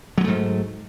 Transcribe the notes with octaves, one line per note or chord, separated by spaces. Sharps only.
G#2 F#3 G3 A3